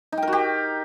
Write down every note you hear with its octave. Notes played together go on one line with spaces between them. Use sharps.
D#4
G5
A#4
F#4
G4